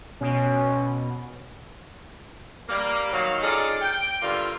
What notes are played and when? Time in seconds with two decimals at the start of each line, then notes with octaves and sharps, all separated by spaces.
0.21 B2 C#4
2.69 G3 A#3
3.13 D#3 F#3 F5
3.43 C#4 D#4 F4 G#4 A4 D5
3.82 G5
4.22 G2 D3 A#3 F4